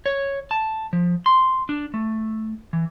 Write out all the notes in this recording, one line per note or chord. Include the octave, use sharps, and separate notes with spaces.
C#5
A5
F3
C6
D4
A3
E3